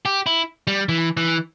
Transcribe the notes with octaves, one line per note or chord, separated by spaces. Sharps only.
G4
E4
G3
E3
E3